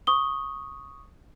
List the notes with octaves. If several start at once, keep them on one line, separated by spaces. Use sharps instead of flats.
C#6 D#6 G7